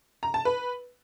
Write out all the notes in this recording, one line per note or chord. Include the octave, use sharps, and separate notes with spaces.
A#5
A5
B4